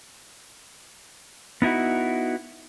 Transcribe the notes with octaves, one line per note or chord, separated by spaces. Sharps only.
B3 D#4 E4 F#4